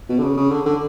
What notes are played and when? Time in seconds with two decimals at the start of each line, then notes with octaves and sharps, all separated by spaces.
0.09 B2
0.19 D3
0.23 C#3
0.37 C#3
0.50 D3
0.65 D3